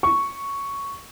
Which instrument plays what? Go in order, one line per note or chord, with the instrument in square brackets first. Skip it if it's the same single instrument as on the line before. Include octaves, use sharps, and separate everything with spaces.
[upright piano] C#6